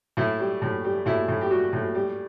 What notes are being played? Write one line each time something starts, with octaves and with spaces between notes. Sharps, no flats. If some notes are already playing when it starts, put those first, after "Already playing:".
A2 E4
G3
A2
G3
A2 E4
A2
G4
G3 F#4
A2
G3